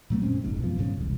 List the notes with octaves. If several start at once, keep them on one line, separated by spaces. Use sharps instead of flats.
A#2 F#3 A3 B3
F#2 G#3 C4 C#4
F1 A#1 G#2
F#2 B2 F3
G1 E2 G#2 C#3
E1 C2